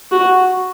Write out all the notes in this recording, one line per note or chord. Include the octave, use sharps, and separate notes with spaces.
F#4